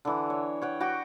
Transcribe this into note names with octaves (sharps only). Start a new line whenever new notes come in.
D3 E3
C#5
C#5 F#5 G5
F#4 F#5 G5 D6